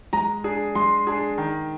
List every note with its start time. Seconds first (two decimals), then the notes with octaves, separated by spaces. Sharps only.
0.13 G#3 A#5
0.44 D4 G#4
0.75 G#3 C6
1.07 D4 G#4
1.38 D#3